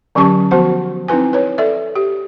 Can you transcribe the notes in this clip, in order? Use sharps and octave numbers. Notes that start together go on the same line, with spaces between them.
D3 F#3 C#4 G4 A5 C#6
F3 B3 F#4 C5 A5
C4 D#4 E4 B4 G#5
B4 C#5
A4 D5 E5
G4